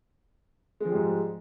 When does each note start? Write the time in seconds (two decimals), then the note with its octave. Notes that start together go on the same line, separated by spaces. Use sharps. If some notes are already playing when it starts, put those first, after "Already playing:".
0.80 G#3
0.85 F3
0.90 G3
0.95 G#2